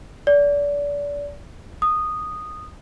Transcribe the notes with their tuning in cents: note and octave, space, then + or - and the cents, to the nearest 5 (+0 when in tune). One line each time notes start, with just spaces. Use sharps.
D5 -30
D#6 -10